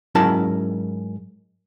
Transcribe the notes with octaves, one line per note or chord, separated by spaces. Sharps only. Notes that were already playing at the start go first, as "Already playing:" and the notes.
G#2 F#3 C#4 E4 A#4 A5